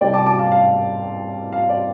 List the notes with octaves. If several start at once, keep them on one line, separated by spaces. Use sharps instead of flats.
C2 C3 G3 D5 G5
A5 D6
A5 D6
F5 A5
F5
F5
D5